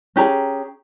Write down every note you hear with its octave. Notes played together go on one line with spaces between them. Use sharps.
C#4 G4 G#4 A#5